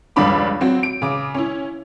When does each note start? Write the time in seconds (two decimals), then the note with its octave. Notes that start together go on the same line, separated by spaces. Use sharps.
0.16 F1 C#2 G2 D4 B5 D6
0.60 F#3 C4 F#4
0.83 D7
1.02 C#3 D6
1.34 C#4 E4